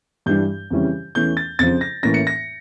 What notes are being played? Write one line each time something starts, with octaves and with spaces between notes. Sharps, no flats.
G2 E3 G3 D4 G6
F2 C#3 E3 G3 C#4
E2 E3 A3 C#4 G6
A6
F2 C#3 F3 A6
A#6
A2 E3 A#3 C#4 A#6
C#7
A#6